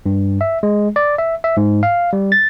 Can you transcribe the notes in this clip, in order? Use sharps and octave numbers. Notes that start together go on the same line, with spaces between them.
G2
E5
G#3
D5
E5
E5
G#2
F5
G3
A6